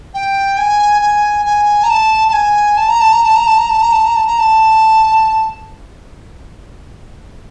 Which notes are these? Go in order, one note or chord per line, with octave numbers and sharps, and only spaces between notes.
G5
G#5
G#5
G#5
A#5
A5
A5
G#5
A5
A#5
A5
A#5
A5
A#5
A5
A#5
A5
A#5
A5
A#5
A5
A#5
A5